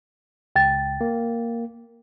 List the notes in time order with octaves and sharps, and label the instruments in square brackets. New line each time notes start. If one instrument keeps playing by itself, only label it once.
[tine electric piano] C#2 [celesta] G5 A6
[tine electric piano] A#3